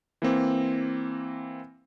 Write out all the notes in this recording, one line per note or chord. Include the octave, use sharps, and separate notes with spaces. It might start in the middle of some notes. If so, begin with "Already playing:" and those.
E3 A#3 C4